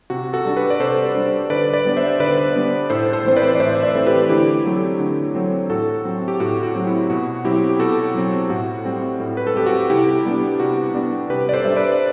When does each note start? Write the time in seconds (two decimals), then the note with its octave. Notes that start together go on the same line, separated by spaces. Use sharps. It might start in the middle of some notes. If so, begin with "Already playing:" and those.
0.10 C3 F#4
0.33 F#4 A4
0.45 G3 D4
0.57 G4 B4
0.70 D5
0.80 C3 A4 C5
1.15 G3 D4
1.50 D3 B4 D5
1.74 B4 D5
1.85 G3 B3 D4
1.97 C5 E5
2.20 D3 B4 D5
2.55 G3 B3 D4
2.90 A2 A4 C5
3.13 A4 C5
3.25 E3 A3 C4 C5
3.36 B4 D5
3.55 D5
3.60 A2 C5 E5
3.76 E5
3.83 B4 D5
3.95 E3 A3 C4
4.06 G4 B4
4.29 D3 E4 G4
4.65 F#3 A3 C4
5.00 D3
5.35 F#3 A3 C4
5.70 A2 F#4 A4
6.05 F#3 C4
6.28 G4
6.40 A2 F#4
6.63 F#4
6.75 F#3 C4
6.87 E4
7.10 B2 F#4
7.45 F#3 C4 E4 G4
7.69 G4
7.80 B2 F#4 A4
8.15 F#3 C4
8.50 A2 F#4
8.85 G3 C4
9.20 A2
9.37 B4
9.47 A4
9.55 G3 C4 G4
9.66 F#4
9.90 C3 E4 G4
10.25 G3 B3 D4
10.60 C3 F#4
10.95 G3 B3 D4
11.30 C3 G4 B4
11.49 D5
11.53 A4 C5
11.65 G3 D4 E5
11.76 B4 D5
11.92 D5